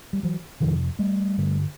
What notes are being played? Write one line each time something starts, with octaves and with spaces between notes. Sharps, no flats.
G3
E3 F#3
F2 C3 D#3 F3
G3 A3
G2 D3